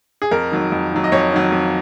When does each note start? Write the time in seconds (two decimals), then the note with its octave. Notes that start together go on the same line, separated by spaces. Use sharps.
0.22 G#4
0.31 F2 A#4
0.52 D#3 F#3
0.72 F2
0.91 D#3 F#3
1.04 D#5
1.12 F2 C#5
1.32 D#3 F#3
1.52 F2